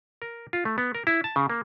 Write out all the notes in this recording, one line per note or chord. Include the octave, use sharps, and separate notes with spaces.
A#4
F4
A3
B3
A#4
E4
A5
C#3
A#3